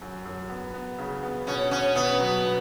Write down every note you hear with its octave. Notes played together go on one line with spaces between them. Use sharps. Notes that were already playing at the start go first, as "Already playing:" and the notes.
F#2
F#2
B3
B3
C#3
B3
B2 C#4
B2 C#4
B2 B3
F#3 B3
B2